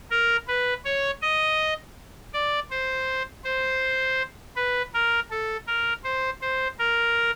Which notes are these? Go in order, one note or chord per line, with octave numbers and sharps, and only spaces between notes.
A#4
B4
C#5
D#5
D5
C5
C5
B4
A#4
A4
A#4
C5
C5
A#4